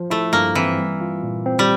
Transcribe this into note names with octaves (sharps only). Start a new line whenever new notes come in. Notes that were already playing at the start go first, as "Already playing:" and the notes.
Already playing: F3
A3 E4
G2 A#3
E3 C4
G3
F4
A#2
C4
G3